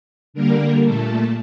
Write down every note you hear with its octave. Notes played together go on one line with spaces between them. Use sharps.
D3 G3 A#3 A#4
A#2 A3 A4